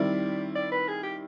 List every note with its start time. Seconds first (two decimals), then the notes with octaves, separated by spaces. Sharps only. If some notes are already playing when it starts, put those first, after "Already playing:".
Already playing: D#3 G3 C4 E4 D5
0.55 D5
0.72 B4
0.88 G#4
1.03 G4